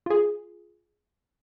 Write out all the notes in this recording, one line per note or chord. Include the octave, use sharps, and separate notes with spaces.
F4 G#4